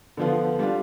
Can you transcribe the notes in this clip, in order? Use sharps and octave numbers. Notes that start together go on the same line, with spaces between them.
D3 F3 B3 F4
G3 D4 F4